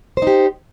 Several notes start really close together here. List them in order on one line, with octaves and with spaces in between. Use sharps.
C5 D#4 G4